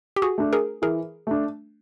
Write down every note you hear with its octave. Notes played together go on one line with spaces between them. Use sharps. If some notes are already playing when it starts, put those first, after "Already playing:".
G4
F#4 G#4
A3 D4
G#4 A#4
E3 G#4 A#4
A3 D4